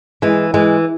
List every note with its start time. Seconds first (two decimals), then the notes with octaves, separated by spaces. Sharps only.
0.22 E3 G#3
0.54 E3 G#3